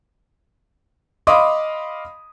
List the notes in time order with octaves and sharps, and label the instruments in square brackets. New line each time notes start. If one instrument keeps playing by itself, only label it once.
[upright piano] D#5 F5 B5 C6 D6 D#6